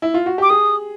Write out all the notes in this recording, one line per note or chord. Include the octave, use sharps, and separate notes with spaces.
E4
F4
F#4
G4 D6
G#4 D#6